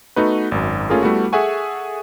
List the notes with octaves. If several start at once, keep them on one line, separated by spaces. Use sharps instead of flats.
A3 B3 D#4 F#4 B4
G#1 F#2
A3 A#3 C#4 F4 G#4 A#4
G3 A3 B3 E4 F#4
G#4 A4 E5 F#5 G#5 C#6